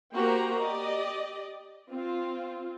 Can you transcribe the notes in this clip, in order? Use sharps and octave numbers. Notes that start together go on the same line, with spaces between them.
A#3 F#4 G4 C5 G5 A#5
G4 D5 D#5
C4 F4